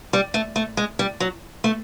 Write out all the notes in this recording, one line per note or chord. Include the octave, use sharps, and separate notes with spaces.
G3
A3
A3
G#3
G3
F#3
A3